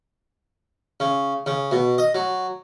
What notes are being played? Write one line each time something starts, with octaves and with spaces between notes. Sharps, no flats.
C#3
C#3
B2
D#5
F#3